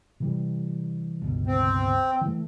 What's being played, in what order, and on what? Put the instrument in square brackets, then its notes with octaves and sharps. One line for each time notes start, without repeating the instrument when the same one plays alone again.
[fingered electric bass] C3 E3 G3
G1 C#2 B2
[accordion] C4
[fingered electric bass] E3 F#3 A3